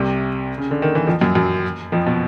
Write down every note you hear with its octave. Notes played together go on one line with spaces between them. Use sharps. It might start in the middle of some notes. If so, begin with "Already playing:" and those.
Already playing: C2 C3
C#3
D3
D#3
E3
F2 F3
F#2 F#3
F#2 F#3
F2 F3
B2